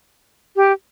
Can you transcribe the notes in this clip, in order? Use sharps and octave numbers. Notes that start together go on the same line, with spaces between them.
G4